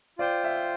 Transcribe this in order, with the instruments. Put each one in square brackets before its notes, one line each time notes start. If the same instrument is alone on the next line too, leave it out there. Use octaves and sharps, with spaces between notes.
[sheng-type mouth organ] F4 C5 G5 [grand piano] D5
[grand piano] E5